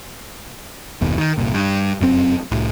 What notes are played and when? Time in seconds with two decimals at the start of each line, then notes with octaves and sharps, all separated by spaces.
1.01 F#1 D#2 B2
1.18 D#3
1.38 G1 C2 A#2
1.54 G2
2.00 F1 F#2 A2 C4
2.51 C2 A2